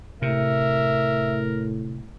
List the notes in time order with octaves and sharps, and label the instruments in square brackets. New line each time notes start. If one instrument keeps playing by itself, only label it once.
[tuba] A2 [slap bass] C3 [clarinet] A#4 [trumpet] E5